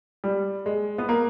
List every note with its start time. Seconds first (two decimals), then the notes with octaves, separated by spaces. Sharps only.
0.24 G3
0.66 G#3
0.98 B3
1.09 A#3